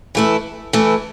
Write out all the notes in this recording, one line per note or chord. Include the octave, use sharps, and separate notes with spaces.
E3 A3 E4
E3 A3 E4